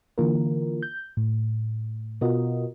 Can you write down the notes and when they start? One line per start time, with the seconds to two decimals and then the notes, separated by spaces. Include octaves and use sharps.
0.18 D3 E3 A#3 F4 A#4
0.82 G6
1.17 A2
2.21 B2 B3 F4 F#4 A#4 D#5